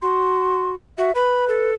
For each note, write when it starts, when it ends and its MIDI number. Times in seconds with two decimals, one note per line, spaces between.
0.02 0.75 66
0.02 0.70 84
0.98 1.11 66
0.98 1.13 76
1.15 1.71 71
1.15 1.45 83
1.48 1.74 69